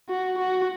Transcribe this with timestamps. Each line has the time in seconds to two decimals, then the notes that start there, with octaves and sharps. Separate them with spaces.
0.09 F#4
0.38 F#4